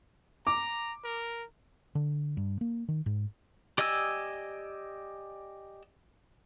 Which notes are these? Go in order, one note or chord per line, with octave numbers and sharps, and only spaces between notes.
A#5 D6
A#4
D3
G2
A#3
D#3
G#2
G4 D5 D#5 G#5 E6